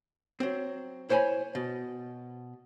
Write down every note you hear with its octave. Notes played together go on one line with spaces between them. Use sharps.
F#3 C4
E4 C5 C#5 G5 G#5 B5
B2